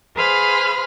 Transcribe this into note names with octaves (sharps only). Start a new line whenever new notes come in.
G#4 B4 C5 F5 B5 F6